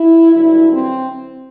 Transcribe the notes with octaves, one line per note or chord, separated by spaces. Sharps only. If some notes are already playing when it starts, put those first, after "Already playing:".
Already playing: E4
G2 D3 F#3 E4
C4